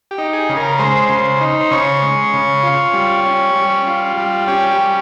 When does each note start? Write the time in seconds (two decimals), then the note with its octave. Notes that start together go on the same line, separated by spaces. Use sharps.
0.11 G4
0.18 D#4
0.33 G#4
0.49 C#3
0.57 A#4
0.79 G#3 C5
1.10 C#3
1.41 D#4
1.61 C5
1.71 C#3 C#5
2.02 G#3
2.33 C#3
2.63 F4
2.94 G3
3.25 C#4
3.56 G3
3.87 F4
4.17 G3
4.48 C#4 G4
4.71 G4
4.78 G3